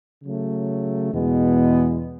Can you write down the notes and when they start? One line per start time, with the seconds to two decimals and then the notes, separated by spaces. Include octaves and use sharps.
0.24 C#3 F#3 A3
1.13 E2 B2 G#3 B3